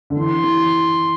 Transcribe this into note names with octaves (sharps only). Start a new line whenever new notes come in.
D3
E3 C6
E3